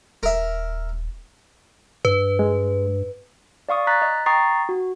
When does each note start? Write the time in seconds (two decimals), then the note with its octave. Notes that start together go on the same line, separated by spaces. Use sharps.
0.23 D#1 A#4 E5
2.05 G2 B4
2.39 G#3
3.69 D5 F5 C#6 D#6
3.87 A#5 F#6 A6 B6
4.02 D#5
4.26 G5 A#5 C#6 D#6 A6 C7
4.69 F#4